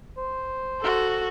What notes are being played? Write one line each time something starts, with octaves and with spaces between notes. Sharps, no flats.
C5
F#4 A4